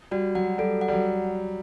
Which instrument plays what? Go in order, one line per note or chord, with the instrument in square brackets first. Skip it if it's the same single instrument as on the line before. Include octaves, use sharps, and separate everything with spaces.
[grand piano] G3 [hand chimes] F#4
[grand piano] F#3 [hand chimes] F#5
[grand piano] G3 [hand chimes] A4
[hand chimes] F#5
[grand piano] G3
F#3